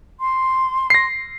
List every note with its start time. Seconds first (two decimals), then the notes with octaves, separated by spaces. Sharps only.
0.20 C6
0.90 A#6 C7